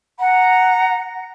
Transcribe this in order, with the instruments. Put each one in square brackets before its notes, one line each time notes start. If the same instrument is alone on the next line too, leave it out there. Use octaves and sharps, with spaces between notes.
[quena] F#5 [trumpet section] A#5